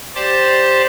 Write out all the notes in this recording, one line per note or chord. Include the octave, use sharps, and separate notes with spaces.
G4 C5 D5 A5